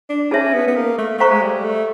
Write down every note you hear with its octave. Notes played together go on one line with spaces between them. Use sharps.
D4
C#4 D#4 G#4 C#5 E5 A5
B3
B3
A#3
A3
A3 C5 F5 A#5 C#6
G#3
G3
A3